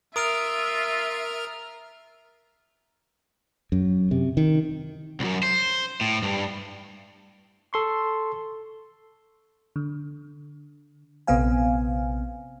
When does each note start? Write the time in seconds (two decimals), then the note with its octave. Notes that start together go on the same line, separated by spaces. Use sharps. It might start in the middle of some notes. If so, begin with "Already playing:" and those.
0.16 F4 A#4 E5 D#6 F6 D7 F7
3.72 F#2
4.11 C3
4.37 D#3
5.20 C2 F#2
5.43 C5
6.01 A2
6.23 G2
7.73 A4 C6 C#6
9.76 D3
11.27 A#1 C3 B3 C4 F5 G#5